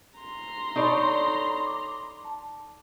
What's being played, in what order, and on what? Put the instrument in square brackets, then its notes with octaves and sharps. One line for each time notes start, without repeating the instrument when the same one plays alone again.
[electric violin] A#5 C6
[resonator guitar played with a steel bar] D#4 A4 D5 [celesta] C#5 B5 C#6
[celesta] D6
A5